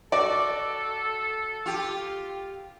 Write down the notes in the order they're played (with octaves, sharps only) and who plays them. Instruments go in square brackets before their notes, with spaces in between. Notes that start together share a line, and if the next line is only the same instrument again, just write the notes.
[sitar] F#4 [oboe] A4 [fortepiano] D5
[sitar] F4 G4